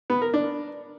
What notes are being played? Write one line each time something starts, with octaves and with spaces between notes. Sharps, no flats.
B3
A#4
D4